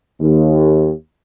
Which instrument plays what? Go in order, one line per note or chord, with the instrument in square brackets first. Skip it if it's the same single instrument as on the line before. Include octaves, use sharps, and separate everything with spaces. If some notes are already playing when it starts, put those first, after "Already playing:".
[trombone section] D#2